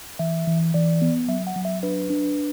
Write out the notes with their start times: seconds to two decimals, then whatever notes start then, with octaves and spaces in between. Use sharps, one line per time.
0.19 E3 E5
0.47 E3
0.74 E3 D5
1.02 B3
1.28 F#3 E5
1.47 F#5
1.56 F#3
1.65 E5
1.83 D4 B4
2.10 D4